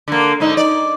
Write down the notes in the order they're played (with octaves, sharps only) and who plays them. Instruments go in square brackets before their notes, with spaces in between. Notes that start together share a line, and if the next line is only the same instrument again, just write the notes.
[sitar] D3 A#3
G#2 D3 D#4
D5